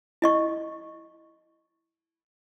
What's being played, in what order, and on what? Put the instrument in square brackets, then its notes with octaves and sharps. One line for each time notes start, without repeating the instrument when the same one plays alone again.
[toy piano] E4 D#5 C#6